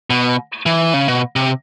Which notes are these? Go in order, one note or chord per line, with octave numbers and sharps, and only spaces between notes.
B2
E3
C#3
B2
C3